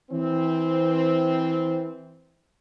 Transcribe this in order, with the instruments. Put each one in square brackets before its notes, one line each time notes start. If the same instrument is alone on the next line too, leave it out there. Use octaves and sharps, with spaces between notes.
[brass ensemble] E3 C4